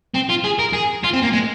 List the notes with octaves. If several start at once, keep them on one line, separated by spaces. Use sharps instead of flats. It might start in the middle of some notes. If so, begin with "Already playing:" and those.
C4
F4
G#4
A#4
G#4
F4
C4
A#3
G#3